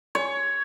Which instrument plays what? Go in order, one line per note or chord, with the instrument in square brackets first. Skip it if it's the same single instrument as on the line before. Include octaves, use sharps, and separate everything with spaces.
[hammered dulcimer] C#5